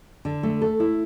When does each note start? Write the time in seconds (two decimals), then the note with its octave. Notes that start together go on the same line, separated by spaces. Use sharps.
0.25 D3
0.43 A3
0.62 A4
0.80 E4